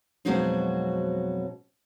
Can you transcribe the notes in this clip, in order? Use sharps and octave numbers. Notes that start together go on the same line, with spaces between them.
F2 B2 F#3 G#3 C4 D#4